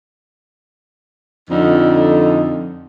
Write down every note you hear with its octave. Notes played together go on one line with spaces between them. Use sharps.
F2 D3 D#4